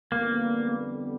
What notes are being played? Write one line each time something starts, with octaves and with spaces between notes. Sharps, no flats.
F2 D3 G3 A#3 B3